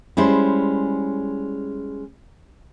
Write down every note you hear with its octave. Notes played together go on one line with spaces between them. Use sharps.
G3 G#3 C#4 E4 C5